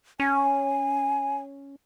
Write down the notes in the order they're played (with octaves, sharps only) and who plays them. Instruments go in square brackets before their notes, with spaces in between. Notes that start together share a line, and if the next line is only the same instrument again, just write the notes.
[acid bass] C#4 [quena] G#5